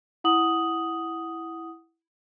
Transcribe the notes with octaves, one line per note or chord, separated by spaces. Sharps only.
E4 F#5 D#6 F#7